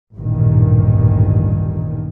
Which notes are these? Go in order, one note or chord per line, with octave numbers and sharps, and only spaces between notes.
A1 D2 G2 A#2 D#3